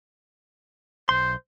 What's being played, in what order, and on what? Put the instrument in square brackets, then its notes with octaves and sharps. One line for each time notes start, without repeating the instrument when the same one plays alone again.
[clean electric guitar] B1 C6 [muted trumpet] C5